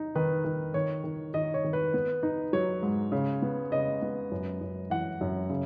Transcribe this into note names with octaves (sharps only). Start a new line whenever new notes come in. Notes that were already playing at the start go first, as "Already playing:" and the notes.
Already playing: D#4
D#3 B4
D#3
D#3 C#5
D#3
D#3 D#5
C#5
D#3
B4
B3
D#4
F#3 C#5
G#2
C#3
B3
C#3 D#5
B3
F#2
F#2
E3 F#5
F#2
C#3